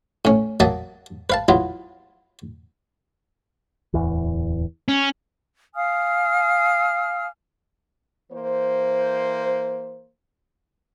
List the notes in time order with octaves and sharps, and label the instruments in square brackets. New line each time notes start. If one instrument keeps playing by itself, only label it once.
[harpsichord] A2 C#4
F#3 A#3 E5 A5 D#6
B4 F5 A5
F#3 B3 E4 F4
[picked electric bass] D1 E2 E3
[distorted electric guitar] C#4
[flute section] F5 G#5 D#6 F6
[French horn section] E3 A#3 C5